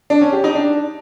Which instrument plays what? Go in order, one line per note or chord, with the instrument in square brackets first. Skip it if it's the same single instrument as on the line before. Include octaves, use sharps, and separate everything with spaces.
[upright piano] D4
C#4
G4
D#4
D4